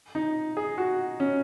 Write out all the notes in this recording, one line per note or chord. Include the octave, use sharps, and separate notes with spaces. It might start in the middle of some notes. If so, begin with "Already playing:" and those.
D#4
G#4
F#4
C#4